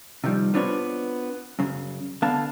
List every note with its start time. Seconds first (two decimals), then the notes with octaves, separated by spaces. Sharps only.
0.24 C3 D#3 F3 G3
0.54 B3 C4 D4 F4 B4 C#5
1.59 F#2 C#3
2.22 D3 B3 F5 A5